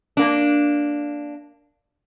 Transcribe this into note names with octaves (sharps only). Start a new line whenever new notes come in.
A#3 D4